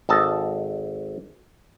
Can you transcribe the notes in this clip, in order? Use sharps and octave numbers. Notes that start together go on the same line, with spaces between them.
G#1 A4 D#5 A5